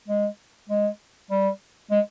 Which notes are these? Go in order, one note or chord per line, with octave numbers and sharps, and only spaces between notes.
G#3
G#3
G3
G#3